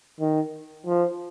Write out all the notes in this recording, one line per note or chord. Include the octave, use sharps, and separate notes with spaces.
D#3
F3